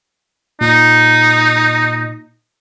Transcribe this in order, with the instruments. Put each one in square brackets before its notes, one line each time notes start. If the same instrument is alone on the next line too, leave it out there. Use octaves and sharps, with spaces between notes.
[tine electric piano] A#2 [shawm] D#4